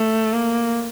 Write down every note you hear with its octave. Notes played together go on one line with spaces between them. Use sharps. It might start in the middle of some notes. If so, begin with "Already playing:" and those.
Already playing: A3
A#3